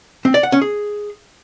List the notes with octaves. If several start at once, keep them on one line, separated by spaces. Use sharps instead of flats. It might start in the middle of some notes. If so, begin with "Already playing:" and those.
C4
D5
F#5
C#4
G#4